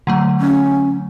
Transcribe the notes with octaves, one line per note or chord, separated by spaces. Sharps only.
D3 F#3 A3
C#4